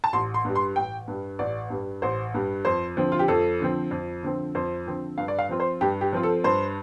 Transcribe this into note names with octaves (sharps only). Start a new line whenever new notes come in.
A5
A1 C6
C6
G2 G3
C6
A1 G5
G2 G3
A1 D5
G2 G3
A1 C5
G2 G3
F2 C5
D3 F3 C4
F4
G4
F2 A4
D3 F3 C4
F2
D3 F3 C4
F2 C5
D3 F3 C4
G2 F5
D5
F5
F3 C4 F4
C5
G2 G4
G4
F3 C4 F4
A4
G2 C5